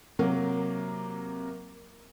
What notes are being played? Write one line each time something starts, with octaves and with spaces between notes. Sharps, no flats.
C3 F#3 A#3 A#4